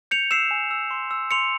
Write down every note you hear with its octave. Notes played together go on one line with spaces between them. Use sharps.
G6 C#7 F7
E6 C7 E7
G#5
E6
C6
E6
C6 C#7 F7